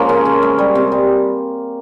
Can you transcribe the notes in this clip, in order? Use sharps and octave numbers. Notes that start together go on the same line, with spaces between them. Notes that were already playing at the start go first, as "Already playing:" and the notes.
Already playing: F3 G#3 A#3 C#4 A#4
C#3
C#3
G#3
G3
C3
G3